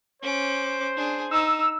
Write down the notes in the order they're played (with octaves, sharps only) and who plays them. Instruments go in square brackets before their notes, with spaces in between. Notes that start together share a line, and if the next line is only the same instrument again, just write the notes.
[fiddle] C#4 D6 [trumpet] C5
[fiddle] D4 G#4
[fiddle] D#4 [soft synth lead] E6